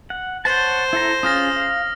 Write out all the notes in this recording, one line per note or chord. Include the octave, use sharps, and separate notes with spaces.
F#5
C5 C#5 F#5 A5
E4 A4 A#5
C#4 F4 G#4 D#6 F6 A#6
F5